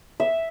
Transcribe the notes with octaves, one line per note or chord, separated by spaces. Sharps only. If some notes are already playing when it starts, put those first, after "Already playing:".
E5